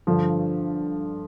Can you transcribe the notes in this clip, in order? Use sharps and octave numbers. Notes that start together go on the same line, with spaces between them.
G2 D3 F3